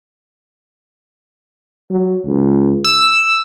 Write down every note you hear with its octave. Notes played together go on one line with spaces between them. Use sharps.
F#3
C#2
E6